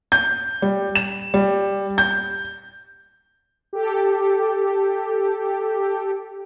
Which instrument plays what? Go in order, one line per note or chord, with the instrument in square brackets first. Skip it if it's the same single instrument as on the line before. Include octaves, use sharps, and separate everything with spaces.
[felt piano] G6
G3
E7
G3
G6
[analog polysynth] G4 A4